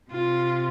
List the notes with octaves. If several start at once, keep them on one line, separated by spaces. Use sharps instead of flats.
C3 F4